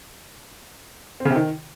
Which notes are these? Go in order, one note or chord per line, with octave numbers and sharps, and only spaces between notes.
C4
C#3
C3
D#3